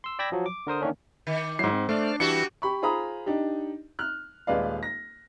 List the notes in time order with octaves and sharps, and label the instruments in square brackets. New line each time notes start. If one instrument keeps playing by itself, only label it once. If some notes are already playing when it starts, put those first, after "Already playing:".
[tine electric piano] C6 E6
D5 G5 B5 E6 G#6 A#6
F3 F#3
D6
D3 A#4 C5 D#6
D#3 A#3 C#4 D4
[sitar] D#3
[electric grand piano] G#2 C7 [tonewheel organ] F#3 E4
[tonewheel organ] C4
[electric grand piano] A3 [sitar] D4 [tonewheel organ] C5 D5 F6
[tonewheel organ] E3 E4 [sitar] G3 D4 F#4 [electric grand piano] C#7
[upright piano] G4 B5 C#6
F4 G#4 C5 A#5 B5 D#6
D4 D#4 G4
F6 F#6
D#1 G#3 B4 D5 F5
A#6